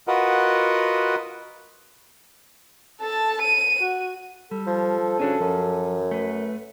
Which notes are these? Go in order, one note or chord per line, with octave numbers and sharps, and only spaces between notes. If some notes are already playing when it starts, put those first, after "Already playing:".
F4 F#4 A#4 B4 D#5 F#5
A4 A5
D#7
F#4
G3 A4
F3
C#3 C#4 D4 F#4
F#2 F3
A3 B4